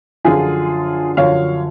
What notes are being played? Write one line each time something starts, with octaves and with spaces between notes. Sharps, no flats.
F#2 D3 F3 F4 G#4
F#2 D3 F3 C#5 F5